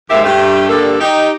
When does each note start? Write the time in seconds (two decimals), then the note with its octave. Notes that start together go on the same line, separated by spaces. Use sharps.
0.10 D#2 G#2 G4 A#4 E5 F5
0.23 G2 A3 G4
0.69 G2 D3 G3 A#3 A4
1.00 D#4 G4